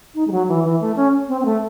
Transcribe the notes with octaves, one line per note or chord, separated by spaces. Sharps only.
D#4
G#3
F#3
E3
E3
A3
C#4
C4
C4
A3